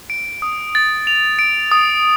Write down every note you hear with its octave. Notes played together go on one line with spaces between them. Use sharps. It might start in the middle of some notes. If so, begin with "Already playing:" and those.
D7
D#6
A6
F7
D7
D#6